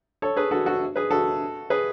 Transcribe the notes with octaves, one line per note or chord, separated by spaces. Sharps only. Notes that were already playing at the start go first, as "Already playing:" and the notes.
A4 C#5
G#4 B4
F#4 A4
F#4 A4
G#4 B4
F#4 A4
G#4 B4